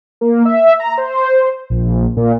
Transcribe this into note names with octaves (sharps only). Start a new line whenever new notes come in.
A#3
E5
A#5
C5
A#1
A#2